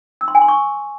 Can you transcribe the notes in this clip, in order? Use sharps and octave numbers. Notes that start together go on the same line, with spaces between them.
E6
C6
G#5
C6
C#6